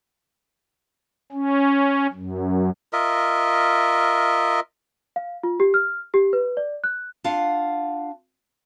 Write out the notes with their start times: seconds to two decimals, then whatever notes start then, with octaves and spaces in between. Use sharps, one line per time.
1.32 C#4
2.13 F#2
2.93 F4 A#4 D#5 E5
5.16 F5
5.43 F4
5.60 G4
5.74 F6
6.14 G4
6.33 B4
6.57 D5
6.84 F#6
7.24 D4 F4 F5 F#5